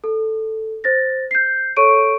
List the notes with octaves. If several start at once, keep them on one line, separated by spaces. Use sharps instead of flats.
A4
C5 A6 A#6
G6 C7
A4 C#5 C#6 D7 D#7